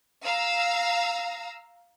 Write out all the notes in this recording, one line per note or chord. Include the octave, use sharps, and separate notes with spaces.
F5 A#5 E6